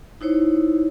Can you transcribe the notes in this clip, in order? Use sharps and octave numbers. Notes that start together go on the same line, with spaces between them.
D#4 E4 C5 C#5